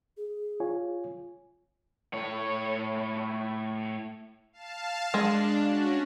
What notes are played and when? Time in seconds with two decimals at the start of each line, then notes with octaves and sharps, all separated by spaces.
0.17 G#4
0.60 F4 C#5 G#5
2.13 A2 C#5
4.53 F5 A5
5.14 G#3 D4
5.63 C#4 F#4